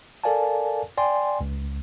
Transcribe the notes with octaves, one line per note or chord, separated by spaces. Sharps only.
A4 A#4 D5 F5 G#5 A5
D5 G5 G#5 C6
C#2